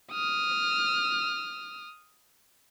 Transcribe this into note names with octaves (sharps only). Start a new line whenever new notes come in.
D#6 F6